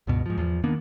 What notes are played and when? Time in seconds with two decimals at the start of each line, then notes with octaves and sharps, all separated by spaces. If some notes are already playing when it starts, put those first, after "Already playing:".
0.07 C#2 G2 B2
0.26 G#2 F3
0.38 E2 F3
0.64 D#3 A#3 B3 D4